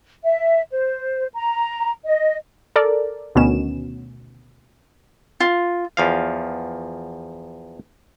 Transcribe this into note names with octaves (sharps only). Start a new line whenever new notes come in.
E5
C5
A#5
D#5
A4 A#4 D5
D2 B2 D#3 B3 C#4 E7
F4
E2 F3 F5